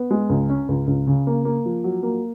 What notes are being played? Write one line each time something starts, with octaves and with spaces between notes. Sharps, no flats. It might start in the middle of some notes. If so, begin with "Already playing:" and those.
Already playing: B3
G#3
C#2
C#4
C#2
C#2
C#3
A#3
A#3
F3
F#3
A#3